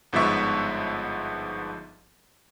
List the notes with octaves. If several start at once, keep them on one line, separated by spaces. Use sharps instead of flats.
G1 G#2 F3 B3 E5 C#6